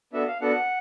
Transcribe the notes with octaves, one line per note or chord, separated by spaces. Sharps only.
B3 D4 F#4 A4 E5
F5
B3 D4 F#4 A4 F#5